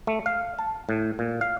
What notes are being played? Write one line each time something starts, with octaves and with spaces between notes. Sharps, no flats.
A3
F5
A5
A2
A#2
F5